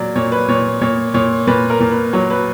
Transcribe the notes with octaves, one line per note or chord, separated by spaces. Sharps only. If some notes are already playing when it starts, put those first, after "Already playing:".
Already playing: A#2 F#3 D5
A#2 C#5
B4
A#2 C#5
A#2 C#5
A#2 C#5
A#2 B4
A#4
A#2
B4
F#3 C#5
B4